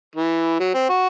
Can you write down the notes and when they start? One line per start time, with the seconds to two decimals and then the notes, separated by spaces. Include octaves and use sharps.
0.15 E3
0.60 F#3
0.74 C4
0.89 F#4